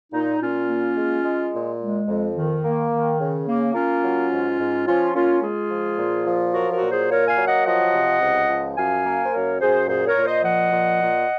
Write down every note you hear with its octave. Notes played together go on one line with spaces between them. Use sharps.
A#2 D#4
A#2 C#4 F4
A#3
G#3
G#3
A#2
G#3
F2
D#3
A#3
D#3
C#3
A#3
A#3 C#4 F4
F#3
G#2
G#2
F3 C#4 F4
A#3 C#4 F4
G#3 F4 G#4
F3
A#2
F3
F#3 F#4 A#4
F#4 A#4
A#2
G#4 C5
A#3 A#4 C#5
F5 G#5
F#3
D#5 F#5
F3 D#5 F#5
C3
C#2
F3
F#2 F5 G#5
A#3
C5
F#2 A#4 C#5
F#2 G#4 C5
A#2 G#4 C5
A#4 C#5
A#2
C5 D#5
F3 D#5 F#5
A#2
A#2